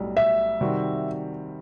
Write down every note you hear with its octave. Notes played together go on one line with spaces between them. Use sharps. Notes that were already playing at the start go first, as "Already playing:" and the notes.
Already playing: B1 A2 G3
E5
C3 D#3 G3 C4 F#4